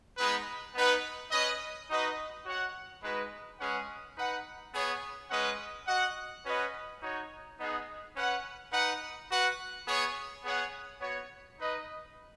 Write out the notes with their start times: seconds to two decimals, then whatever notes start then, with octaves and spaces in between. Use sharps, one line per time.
0.17 G#3 B3 D#4 B4
0.75 B3 D#4 B4 F#5
1.31 C#4 B4 D#5
1.89 D#4 F#4 B4 D#5
2.45 F#4 C#5 F#5
3.03 G#3 D#4 F#4 B4
3.60 G#3 C#4 G#4 B4 F#5
4.16 D#4 B4 F#5
4.74 B3 G#4 C#5
5.30 G#3 C#4 B4 D#5 F#5
5.87 F#4 D#5 F#5
6.45 C#4 F#4 B4 D#5 F#5
7.01 D#4 F#4 C#5
7.59 B3 D#4 G#4 D#5 F#5
8.16 C#4 B4 F#5
8.72 D#4 B4 F#5
9.29 F#4 B4 F#5
9.87 B3 G#4 C#5
10.44 B3 G#4 C#5 F#5
11.01 B3 F#4 C#5
11.58 D#4 B4 D#5